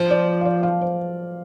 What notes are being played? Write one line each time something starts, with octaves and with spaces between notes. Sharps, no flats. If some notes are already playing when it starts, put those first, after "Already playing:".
Already playing: F3 C5
D5
F5
D5
F5
C5